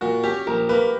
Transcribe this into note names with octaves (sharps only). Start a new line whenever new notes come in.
A#2 F#4
C#4 G4
A#1 A#4
A#3 B4